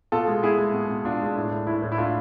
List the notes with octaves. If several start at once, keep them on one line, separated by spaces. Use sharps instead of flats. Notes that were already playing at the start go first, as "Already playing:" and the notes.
B2 F4 A4
G#3
B2 E4 G#4
G#3
B2
B2
B2 D4 F4
G#3 D4
A2
A2
A2 E4
A2
E4
A2 D4 F4